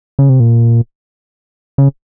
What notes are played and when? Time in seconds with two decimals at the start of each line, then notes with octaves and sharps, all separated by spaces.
0.19 C#3
0.29 C3
0.40 A#2
1.78 C#3